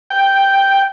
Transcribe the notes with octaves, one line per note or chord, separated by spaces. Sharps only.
G5